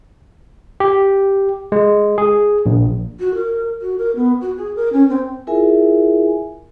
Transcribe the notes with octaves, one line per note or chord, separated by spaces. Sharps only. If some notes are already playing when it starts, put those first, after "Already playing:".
G4
G#3
G#4
A#1
F#4
A#4
F#4
A#4
B3
F#4
G#4
A#4
C#4
C4
E4 F4 G#4 A#4 E5 G#5